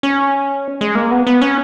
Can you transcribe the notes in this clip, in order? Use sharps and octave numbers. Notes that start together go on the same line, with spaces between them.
C#4
G#3
A#3
B3
B3
C#4